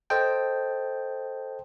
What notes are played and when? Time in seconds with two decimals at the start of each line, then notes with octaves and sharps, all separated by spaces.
0.10 A4 C5 D#5 G5 A5